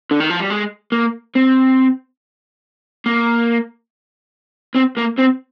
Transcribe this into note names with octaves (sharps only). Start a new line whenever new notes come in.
D3
D#3
F3
G3
G#3
A#3
C4
A#3
C4
A#3
C4